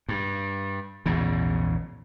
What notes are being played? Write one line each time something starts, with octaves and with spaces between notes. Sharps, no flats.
G2
A#1 E2 G#2 C#3